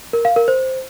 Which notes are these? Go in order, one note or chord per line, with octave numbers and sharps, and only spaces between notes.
A#4
F5
A#4
C5